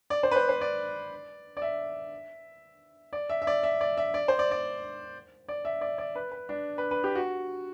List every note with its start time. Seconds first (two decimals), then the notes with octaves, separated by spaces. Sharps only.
0.10 D5
0.23 C5
0.31 B4
0.36 C5
0.49 C5
0.61 D5
1.57 D5
1.62 E5
3.13 D5
3.30 E5
3.42 E5
3.47 D5
3.63 E5
3.81 D5
3.97 E5
4.14 D5
4.28 C5
4.39 D5
4.51 D5
5.48 D5
5.65 E5
5.81 D5
5.98 D5
6.15 B4
6.32 B4
6.49 D4
6.78 B4
6.91 B4
7.04 G4
7.15 F#4